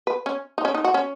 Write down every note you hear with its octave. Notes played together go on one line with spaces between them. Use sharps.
B4
C#4
D#4
C#4
D#4
F#4
C#4